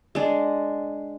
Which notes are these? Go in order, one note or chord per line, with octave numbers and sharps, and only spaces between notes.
G#3 D4